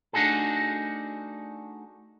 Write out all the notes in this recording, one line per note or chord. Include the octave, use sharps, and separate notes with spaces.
A3 D4 D#4 F#4 G#4 A4